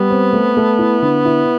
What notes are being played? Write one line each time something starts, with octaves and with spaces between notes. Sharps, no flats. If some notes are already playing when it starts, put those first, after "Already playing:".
Already playing: G3 B3
C4
A3
A3
E4
D3
E4